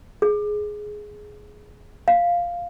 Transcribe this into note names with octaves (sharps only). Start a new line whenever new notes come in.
G#4
F5